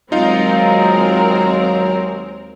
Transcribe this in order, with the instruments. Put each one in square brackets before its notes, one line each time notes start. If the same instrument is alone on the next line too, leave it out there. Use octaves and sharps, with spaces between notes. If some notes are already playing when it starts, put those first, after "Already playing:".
[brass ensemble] D#2 F#3 [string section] G#3 C4 A#4 [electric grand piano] D#4 F4 F5